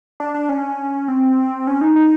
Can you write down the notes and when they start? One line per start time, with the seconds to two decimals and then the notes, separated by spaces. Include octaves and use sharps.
0.20 D4
0.34 D4
0.49 C#4
1.08 C4
1.67 C#4
1.81 D#4
1.96 D#4